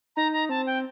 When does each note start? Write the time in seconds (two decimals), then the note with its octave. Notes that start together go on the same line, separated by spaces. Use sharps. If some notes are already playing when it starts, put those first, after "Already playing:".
0.16 D#4 A#5
0.33 A#5
0.49 C4 A5
0.67 G5